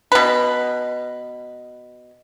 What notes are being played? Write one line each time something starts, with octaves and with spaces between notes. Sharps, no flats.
B2 B4